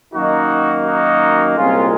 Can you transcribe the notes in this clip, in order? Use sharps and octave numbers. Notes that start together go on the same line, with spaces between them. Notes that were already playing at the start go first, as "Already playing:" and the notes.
F#2 D#3 A#3 D#4 F#4
D#4 F#4
C2 A#2 G#3 C4 C#4 F4